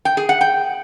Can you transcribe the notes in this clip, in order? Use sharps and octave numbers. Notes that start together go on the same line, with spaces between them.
G5
G#4
F#5
G5